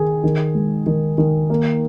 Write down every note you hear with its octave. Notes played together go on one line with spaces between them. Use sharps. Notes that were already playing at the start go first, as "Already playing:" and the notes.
Already playing: D#3 G#4
D#3
G#3
D#3
D#3
A#3